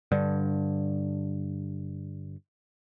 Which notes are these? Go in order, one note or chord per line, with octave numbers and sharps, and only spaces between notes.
G2 D3